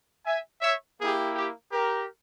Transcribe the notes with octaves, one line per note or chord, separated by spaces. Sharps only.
E5 G#5
C#5 E5
A#3 E4 G4 G#4
G4
G4 A#4